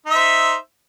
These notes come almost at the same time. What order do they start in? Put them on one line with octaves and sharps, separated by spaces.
D#4 E5 C5